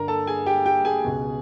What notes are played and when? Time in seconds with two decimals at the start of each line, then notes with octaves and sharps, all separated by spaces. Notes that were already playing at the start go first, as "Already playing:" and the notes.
Already playing: G2 D3 A#4 A#5
0.08 A4 A5
0.27 G#4 G#5
0.46 G4 G5
0.66 G4 G5
0.85 G#4 G#5
1.04 C#2 B2